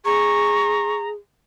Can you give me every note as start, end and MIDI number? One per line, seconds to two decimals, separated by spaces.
0.05 1.13 68
0.05 1.08 82
0.05 0.95 85